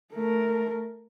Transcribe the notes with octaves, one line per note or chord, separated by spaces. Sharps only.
A3 A#4